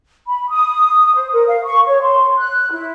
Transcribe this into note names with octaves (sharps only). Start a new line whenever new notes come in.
B5
D#6
C5
A#4
F5
C#6
C#5
C6
F#6
E4